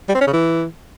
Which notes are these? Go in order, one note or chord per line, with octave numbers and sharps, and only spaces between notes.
G3
C4
C#4
C#3
E3